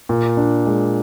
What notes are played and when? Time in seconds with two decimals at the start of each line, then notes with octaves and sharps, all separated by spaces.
0.09 A#2
0.37 D4
0.67 G#3